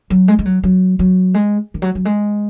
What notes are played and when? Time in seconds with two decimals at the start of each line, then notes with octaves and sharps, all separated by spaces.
0.10 F#3
0.28 G#3
0.39 G#3
0.45 F#3
0.63 F#3
0.99 F#3
1.34 G#3
1.74 D#3
1.82 F#3
1.95 F#3
2.05 G#3